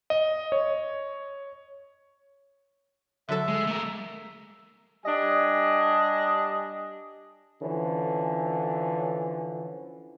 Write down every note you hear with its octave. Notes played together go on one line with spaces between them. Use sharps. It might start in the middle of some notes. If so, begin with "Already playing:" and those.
D#5
C#5
D3 F#3 A4 E5
G#3
A3 A#4
G3 D4 D#5 G#5
D3 E3 F3 C#4